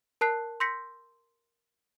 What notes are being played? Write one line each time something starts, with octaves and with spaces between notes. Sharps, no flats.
A#4 A5 F#6 C7
C6 E6 G6 A#6 B6 C#7